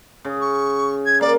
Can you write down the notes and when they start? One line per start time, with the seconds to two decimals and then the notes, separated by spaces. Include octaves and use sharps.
0.25 C#3
0.41 C#6
1.05 G#6
1.21 A#3 D5